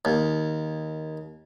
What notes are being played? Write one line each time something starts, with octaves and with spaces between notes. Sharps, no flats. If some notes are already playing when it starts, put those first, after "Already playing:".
D#2